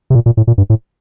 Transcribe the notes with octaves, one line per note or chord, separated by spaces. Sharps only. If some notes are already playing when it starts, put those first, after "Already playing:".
C3
A#2
A#2
A2
A#2
G2
A2